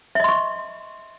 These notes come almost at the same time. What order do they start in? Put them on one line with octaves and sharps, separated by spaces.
E5 D#5 C6 C#6